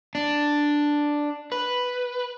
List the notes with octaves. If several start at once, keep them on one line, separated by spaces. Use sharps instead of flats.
D4
B4